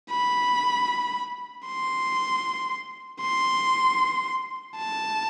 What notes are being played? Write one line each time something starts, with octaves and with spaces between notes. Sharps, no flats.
B5
C6
C6
A5